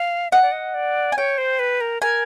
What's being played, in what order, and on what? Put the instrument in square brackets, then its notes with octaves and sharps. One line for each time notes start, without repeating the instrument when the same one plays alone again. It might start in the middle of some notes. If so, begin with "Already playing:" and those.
Already playing: [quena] F5
[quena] D#5 [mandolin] F#5
[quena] D5
D#5
D5
[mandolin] G#5
[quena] C#5 [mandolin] G5
[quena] C5
B4
A#4
[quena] A#4 [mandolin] G#5